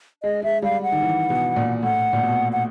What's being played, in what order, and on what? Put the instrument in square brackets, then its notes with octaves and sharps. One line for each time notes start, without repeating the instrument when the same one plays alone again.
[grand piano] G#3 [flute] D#5
[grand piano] G#3 [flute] E5
[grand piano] G3 [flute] F5
[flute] F#5
[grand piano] D#3
E3
B2
A#2
[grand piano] A2 [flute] F#5
[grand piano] A#2
B2
[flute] F#5